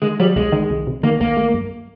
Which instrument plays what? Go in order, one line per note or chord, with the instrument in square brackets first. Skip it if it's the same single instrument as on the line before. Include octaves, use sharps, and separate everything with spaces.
[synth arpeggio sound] D#3 [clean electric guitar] G#3
[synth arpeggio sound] F#3 [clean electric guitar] G3
[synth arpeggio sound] C2 [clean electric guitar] G#3
[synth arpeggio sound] D#3
C2
C3
[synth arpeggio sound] D#3 [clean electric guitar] A#3
[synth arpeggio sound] C2 [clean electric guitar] A#3
[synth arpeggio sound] A3
G2